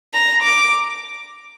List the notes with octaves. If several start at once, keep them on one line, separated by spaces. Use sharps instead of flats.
A#5
D6